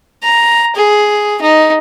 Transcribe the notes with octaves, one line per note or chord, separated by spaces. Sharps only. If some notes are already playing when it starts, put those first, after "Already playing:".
A#5
G#4
D#4